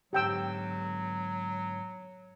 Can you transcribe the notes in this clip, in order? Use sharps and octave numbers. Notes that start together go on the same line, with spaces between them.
G#2 D3 F#3 B3 G4 G5 E6